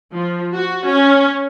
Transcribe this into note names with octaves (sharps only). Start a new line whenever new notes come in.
F3
F#4
C#4